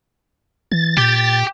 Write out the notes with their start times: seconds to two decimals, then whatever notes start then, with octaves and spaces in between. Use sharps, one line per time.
0.72 E3 A6
0.97 A#2 G4 G5